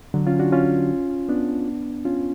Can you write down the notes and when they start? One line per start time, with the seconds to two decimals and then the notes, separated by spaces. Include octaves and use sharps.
0.14 D3 F#3
0.27 C#4 F4
0.39 D4 F#4
0.52 C#4 F4
1.29 B3 D4
2.05 C#4 F4